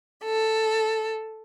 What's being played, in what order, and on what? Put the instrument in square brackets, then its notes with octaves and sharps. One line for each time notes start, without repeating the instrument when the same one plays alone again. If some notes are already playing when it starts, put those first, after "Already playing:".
[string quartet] A4